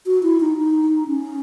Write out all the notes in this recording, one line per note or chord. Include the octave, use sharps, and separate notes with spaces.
F#4
E4
D#4
D#4
C#4